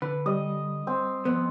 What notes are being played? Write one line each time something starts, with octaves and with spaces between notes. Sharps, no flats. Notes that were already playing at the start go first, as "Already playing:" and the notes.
D3 B4
G3 D#5
C4
F2 B3